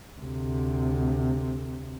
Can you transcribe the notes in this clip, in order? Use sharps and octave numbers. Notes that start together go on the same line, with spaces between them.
D2 C3